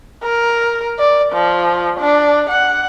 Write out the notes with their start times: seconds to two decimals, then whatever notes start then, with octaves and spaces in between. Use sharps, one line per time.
0.23 A#4
0.99 D5
1.33 F3
2.00 D4
2.50 F#5